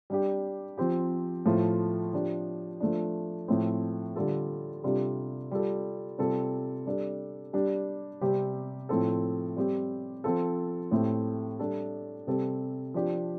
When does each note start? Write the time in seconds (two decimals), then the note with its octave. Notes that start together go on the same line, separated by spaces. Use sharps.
0.10 G3 D4 G4
0.78 F3 C4 G4
1.46 A2 F3 A3 F4
2.13 F3 D4 G4
2.80 F3 A3 D4
3.48 A2 F3 A3 C4
4.16 D3 G3 F4 A4
4.83 C3 G3 D4 F4 A4
5.51 G3 F4 A4
6.18 C3 G3 C4 F4 A4
6.86 G3 D4 A4
7.53 G3 D4 G4
8.21 C3 G3 C4 G4
8.89 A2 F3 C4 A4
9.56 G3 C4 G4
10.24 F3 C4 F4 A4
10.91 A2 A3 C4 G4
11.59 G3 D4 A4
12.27 C3 G3 C4 A4
12.94 F3 D4 G4